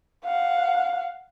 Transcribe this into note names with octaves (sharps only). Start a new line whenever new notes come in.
F5 F#5